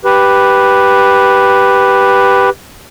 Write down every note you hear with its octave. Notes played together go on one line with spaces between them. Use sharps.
G4 B4